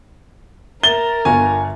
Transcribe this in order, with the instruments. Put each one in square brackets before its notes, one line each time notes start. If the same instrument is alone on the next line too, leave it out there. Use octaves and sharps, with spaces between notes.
[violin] A#4 [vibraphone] E5 [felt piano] A6 [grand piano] G7
[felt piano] G1 F4 C#6 [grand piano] G#5